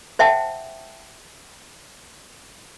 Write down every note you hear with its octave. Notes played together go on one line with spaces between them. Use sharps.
C5 E5 F#5 G5 A5